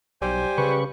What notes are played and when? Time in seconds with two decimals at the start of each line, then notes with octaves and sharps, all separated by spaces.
0.22 B1 G3 C5 G#5
0.58 C#3 B4 C#6